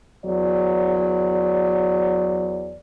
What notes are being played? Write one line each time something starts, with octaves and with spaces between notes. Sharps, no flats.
E2 F#3 D5